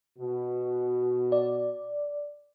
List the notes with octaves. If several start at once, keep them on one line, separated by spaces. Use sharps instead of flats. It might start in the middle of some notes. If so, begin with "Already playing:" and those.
B2 F#4
D5